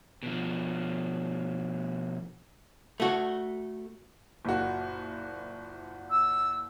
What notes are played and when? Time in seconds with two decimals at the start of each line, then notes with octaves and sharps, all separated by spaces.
0.23 B2 F3
3.00 A3 F#4
4.45 F#1 A#2 F#4
6.10 E6